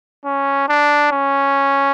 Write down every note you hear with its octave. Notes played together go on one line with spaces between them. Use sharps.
C#4
D4
C#4